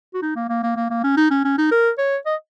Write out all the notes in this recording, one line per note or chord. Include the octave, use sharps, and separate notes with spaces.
F#4
D#4
A#3
A#3
A#3
A#3
A#3
C#4
D#4
C#4
C#4
D#4
A#4
C#5
D#5